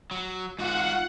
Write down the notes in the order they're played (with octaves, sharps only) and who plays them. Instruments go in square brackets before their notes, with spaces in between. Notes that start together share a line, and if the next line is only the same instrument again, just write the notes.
[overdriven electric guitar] F#3
[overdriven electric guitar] G#2 F#4 [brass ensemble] F4 [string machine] F#5